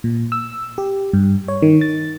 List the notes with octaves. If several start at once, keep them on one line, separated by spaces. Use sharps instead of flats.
A#2
E6
G4
G2
C#5
D#3
A6